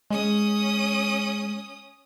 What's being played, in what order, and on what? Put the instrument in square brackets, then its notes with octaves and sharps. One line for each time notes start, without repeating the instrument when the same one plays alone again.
[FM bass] G#3 [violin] C#4 D#6